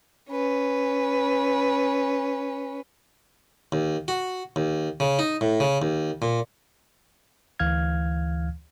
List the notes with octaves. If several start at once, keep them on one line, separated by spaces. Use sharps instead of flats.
C#4 B4
D#2
F#4
D#2
C#3
D#4
A2
C#3
D#2
A#2
D2 E3 F5 F6 G#6